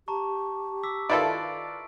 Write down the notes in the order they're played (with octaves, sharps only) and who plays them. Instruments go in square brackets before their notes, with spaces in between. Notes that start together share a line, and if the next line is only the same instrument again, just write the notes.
[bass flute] G4 [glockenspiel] A5 A#5 C#6
[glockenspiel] D6 E6 B6
[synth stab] D#3 E4 A4 [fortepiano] F4 B4 D5 [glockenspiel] D7